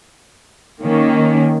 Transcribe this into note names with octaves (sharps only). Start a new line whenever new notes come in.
D#3 A#3 C#4